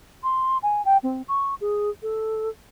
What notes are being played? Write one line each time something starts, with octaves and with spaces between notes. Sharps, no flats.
C6
G#5
G5
C4
C#6
G#4
A4